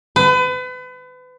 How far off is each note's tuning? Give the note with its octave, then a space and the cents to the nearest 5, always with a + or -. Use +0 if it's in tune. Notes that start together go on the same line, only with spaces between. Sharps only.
B4 +35